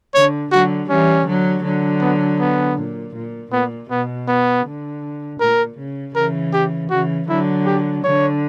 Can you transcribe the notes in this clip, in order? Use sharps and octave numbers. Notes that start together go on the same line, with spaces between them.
D3 C#5
D3 F#3 F#4
E3 G3 C#4
D3 F#3
D3 F#3
B3
B3
A#2
A#2
A#2 B3
B2 B3
B3
D3
A#2 A#4
C#3
C#3 E3 A#4
G4
C#3 E3 F#4
D3 F#3 E4
G4
D3 C#5